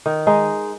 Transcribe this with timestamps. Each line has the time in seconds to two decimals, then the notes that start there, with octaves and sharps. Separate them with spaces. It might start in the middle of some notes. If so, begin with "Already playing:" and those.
0.06 D#3
0.27 G#3 D#4